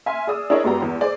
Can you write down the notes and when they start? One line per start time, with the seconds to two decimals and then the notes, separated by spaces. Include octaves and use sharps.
0.06 E5 G#5 C6 F6
0.27 G#4 D5 D#6 E6
0.50 D4 E4 G#4 A#4 C#5 D#5
0.64 G2 G#3 B3 F#4 G4 A#5
0.82 E2
1.01 G#4 C5 D5